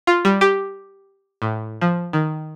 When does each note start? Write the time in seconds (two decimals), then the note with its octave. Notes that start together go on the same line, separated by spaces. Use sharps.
0.07 F4
0.25 G3
0.41 G4
1.42 A2
1.81 F3
2.13 D#3